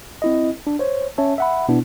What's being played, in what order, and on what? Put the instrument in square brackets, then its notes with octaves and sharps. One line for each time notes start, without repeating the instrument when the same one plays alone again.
[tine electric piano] C4 E4 D#5
D4
C5 C#5
C#4 C#5 E5 A5
E5 F#5 B5
B2 B3 D4 E4